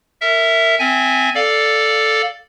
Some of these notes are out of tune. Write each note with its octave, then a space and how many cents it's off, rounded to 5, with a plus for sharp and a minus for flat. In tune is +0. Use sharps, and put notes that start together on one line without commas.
A#4 -25 E5 +0
C4 -15 E5 +0 G#5 +0
A4 +0 D5 +0 F5 +10